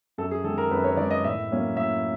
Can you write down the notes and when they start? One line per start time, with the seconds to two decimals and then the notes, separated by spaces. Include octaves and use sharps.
0.18 F#2 A4
0.31 G#4
0.44 D#3 G#3 A4
0.58 A#4
0.71 F#2 B4
0.84 C#5
0.97 D#3 G#3 D5
1.11 D#5
1.24 A2 E5
1.51 F#3 A#3 C#4
1.77 A2 E5